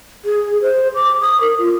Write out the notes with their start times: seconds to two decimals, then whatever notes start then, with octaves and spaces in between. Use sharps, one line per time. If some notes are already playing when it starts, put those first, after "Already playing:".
0.25 G#4
0.62 C5
0.95 D6
1.21 D#6
1.41 A#4
1.58 F4